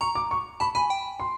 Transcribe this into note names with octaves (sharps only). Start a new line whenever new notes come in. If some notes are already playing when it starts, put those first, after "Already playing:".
A#5 C#6
D6
C#6
A5 B5
G#5 B5
G5
C6